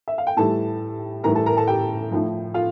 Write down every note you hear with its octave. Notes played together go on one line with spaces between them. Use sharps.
E5
F5
G5
A2 E3 G3 A4 A5
A2 E3 G3 A#4 A#5
A4 A5
A#4 A#5
A4 A5
G4 G5
A2 F3
F4 F5